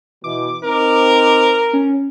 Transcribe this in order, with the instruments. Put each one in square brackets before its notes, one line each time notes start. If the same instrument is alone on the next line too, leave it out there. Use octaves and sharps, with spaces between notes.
[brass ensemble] B2 E3 [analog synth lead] D6
[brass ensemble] C4 D#4 [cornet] A#4
[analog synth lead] C#4